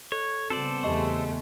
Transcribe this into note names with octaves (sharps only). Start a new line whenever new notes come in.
A4 C#5
C#3 G3 B3 C4 A4 C5 D5
E2 G#3 A3 G4 D#5 C#6